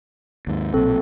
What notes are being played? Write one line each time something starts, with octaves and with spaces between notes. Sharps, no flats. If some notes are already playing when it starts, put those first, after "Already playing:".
D#2 G#2
B1 A#2 C4 A4